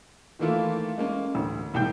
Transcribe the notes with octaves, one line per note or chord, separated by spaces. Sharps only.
D#3 E3 A3 A#3 E4 F4
G#3 A#3 C#4
A1 D2
E1 C2 G#2 G5 G6